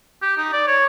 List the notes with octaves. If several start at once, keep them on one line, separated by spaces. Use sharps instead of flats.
G4
D#4
D5
C#5